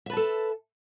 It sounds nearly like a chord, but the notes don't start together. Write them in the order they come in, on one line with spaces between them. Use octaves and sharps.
E5 B4 A5 A4